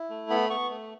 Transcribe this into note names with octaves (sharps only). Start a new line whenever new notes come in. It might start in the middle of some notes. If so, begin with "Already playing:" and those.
Already playing: E4
A3
B3 B5
B3 C#6
A3